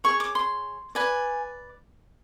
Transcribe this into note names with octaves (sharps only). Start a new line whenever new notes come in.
G#4 C#5 C#6
D6
C6
B4 D5 G#5